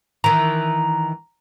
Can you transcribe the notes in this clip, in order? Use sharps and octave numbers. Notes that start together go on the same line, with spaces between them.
D#3 E3 A#5